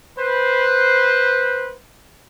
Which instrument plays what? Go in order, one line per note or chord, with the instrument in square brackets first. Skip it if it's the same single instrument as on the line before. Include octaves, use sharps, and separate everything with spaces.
[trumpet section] B4 C5